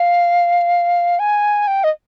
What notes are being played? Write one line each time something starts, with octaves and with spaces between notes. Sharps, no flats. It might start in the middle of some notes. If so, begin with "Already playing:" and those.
Already playing: F5
G#5
G5
D#5